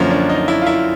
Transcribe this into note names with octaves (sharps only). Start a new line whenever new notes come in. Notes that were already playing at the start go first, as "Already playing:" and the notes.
Already playing: F#2 D3 F3 A#3 C#4
D4
D#4
E4
F4
E4